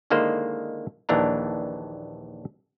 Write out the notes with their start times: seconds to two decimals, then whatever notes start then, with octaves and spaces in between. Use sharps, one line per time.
0.10 D3 D#3 G#3 A#3 E4 C5
1.09 A#1 D#2 E3 D4 A#5